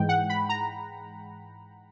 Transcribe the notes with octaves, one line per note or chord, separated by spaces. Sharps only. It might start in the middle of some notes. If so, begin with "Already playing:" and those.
Already playing: G#2 E3 G#3 G5
F#5
B5
A#5